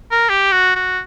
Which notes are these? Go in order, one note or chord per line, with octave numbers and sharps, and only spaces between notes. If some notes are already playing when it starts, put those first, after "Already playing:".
A#4
G4
F#4
F#4